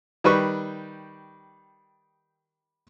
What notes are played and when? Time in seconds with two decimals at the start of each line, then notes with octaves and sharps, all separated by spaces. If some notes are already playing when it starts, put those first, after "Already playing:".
0.24 D#3 G3 B4 C#6